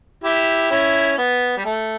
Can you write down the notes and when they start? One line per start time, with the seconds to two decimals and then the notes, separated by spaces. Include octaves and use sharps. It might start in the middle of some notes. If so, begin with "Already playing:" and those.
0.24 E4 G4
0.71 C#4 E4
1.18 B3
1.58 G3
1.65 A3